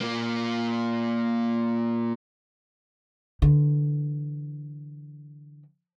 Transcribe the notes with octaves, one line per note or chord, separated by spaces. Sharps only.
A#2 A#3
D3 E3